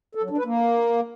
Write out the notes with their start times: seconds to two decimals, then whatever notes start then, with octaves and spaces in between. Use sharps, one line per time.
0.15 A4
0.23 F#3
0.30 D4
0.38 B4
0.45 A#3